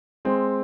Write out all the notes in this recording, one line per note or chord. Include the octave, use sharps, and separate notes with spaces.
G#3 C4